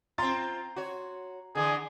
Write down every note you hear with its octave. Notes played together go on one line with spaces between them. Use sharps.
C4 F4 A#5 C6 A6
F#4 C#5
D3 E3 G#4